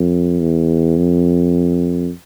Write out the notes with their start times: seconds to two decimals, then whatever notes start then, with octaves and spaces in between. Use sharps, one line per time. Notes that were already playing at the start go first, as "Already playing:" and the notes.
Already playing: F2
0.41 E2
0.97 F2